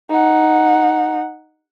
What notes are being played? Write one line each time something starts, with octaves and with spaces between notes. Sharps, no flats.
D#4 F#5